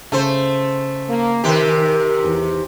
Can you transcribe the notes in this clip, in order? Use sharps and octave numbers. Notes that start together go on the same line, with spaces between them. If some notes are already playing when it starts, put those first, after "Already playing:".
C#3 A3 C5
A#3
C3 D#3 G4 A#4
E2